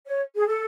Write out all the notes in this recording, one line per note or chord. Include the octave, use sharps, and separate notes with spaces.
C#5
G#4
A4